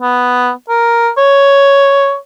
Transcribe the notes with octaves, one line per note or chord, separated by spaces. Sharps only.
B3
A#4
C#5